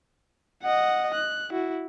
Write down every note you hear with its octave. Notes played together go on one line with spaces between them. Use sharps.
D#5 F#5
F#6
E4 F#4